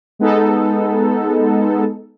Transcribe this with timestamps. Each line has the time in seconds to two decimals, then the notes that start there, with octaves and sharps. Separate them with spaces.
0.19 G#3 B3 D#4 A4